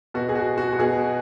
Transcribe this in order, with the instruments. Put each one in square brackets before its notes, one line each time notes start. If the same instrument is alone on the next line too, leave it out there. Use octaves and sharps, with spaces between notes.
[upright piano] B2 F#4
G#4
F#4
F#4
F#4
B2 G#4